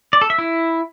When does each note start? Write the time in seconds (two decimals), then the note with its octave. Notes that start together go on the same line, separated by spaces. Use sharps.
0.13 D5
0.21 A4
0.30 E5
0.38 E4